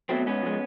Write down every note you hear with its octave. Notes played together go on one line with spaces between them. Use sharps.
B2 F#3 A3 C4
G#2 B3 C#4
F3 G#3